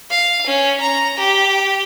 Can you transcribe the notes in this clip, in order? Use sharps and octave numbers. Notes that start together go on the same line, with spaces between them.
F5
C#4
A#5
G4